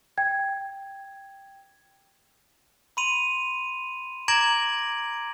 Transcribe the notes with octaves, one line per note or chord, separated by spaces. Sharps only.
G5 G#6
B5 C6 D#7 F7
A#5 D6 G#6 A#6 D7 F#7